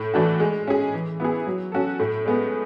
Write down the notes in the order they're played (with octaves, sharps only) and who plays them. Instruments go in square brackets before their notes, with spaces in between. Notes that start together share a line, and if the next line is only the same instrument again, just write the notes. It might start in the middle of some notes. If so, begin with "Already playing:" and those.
Already playing: [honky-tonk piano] A2
E3 A3 D4 F#4
G#3
C#4 G#4
E3
B3 E4 G#4
F#3
C#4 F#4 A4
A2
G#3 B3